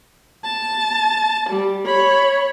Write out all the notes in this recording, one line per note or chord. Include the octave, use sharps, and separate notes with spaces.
A5
G3
C#5 B5